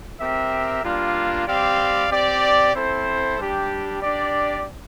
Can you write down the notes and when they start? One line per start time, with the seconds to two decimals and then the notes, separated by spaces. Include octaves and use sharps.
0.20 C4 G4 A#4 E5
0.83 G3 A#3 D4 F4
1.47 G3 C4 G4 D5 F5
2.11 C4 G4 D5
2.75 C4 E4 A4 C5
3.38 G3 D4 G4
4.03 D4 G4 D5